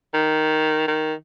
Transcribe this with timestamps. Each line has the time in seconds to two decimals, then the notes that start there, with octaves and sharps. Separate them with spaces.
0.14 D#3
0.88 D#3